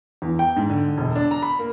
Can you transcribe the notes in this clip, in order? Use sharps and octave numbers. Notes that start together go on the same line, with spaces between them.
E2
G5
G#2
D3
E1
D4
A#5
B5
A#3